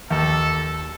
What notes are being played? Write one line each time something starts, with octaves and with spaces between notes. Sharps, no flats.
D#2 A4